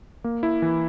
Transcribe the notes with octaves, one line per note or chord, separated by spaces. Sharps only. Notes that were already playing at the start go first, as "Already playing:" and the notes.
A#3
E4
E3